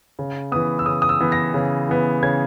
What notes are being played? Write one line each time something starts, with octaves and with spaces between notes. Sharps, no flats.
C#3
E3 B3 D#6
E6
C#3 D#6
D#6
E6
E3 B3
A#6
C#3
E3 B3
C#3 G#6